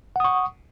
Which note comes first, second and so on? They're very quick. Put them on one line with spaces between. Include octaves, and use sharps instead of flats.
F#5 D#6 C#6